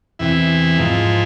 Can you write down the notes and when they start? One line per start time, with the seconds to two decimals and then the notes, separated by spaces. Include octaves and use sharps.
0.19 E2 C3 E3 E4
0.78 G#2 F3